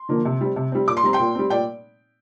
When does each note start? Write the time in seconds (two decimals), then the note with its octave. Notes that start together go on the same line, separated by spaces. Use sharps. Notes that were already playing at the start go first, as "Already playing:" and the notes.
Already playing: C6
0.09 D3 F3 A#3
0.25 C3
0.41 G3 C4
0.56 C3
0.72 G3 C4
0.88 A#2 D6
0.97 C6
1.03 G3 C4 A#5
1.13 G5 C6
1.19 A#2
1.35 G3 C4
1.50 A#2 D5 G5